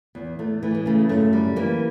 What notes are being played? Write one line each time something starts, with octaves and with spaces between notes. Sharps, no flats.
E2
E2 A3
E3 A3
G#3
C#3 A3
F#2 A3
G3
E3 A#3